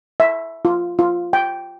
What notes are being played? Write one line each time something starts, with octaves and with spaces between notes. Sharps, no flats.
E5
F4
F4
G5